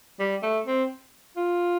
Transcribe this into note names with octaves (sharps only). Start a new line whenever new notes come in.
G3
A3
C4
F4